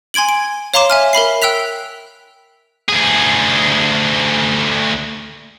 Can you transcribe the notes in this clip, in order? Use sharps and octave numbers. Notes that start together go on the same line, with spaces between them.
G#5 C6 G#6 D7 F#7
D7
C#5 F5 A#5 C6 D6 E7
E5 G#5 F6
A#4 E5 B5 C7
G5 E6 F#6 B6 F7
D2 G#4